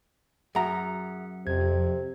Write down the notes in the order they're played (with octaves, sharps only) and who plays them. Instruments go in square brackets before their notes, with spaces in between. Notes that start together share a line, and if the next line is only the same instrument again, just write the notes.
[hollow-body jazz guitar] F#2 A#5 [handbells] G#4 E5 F#5
[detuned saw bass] F2 [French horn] C3 [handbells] G#6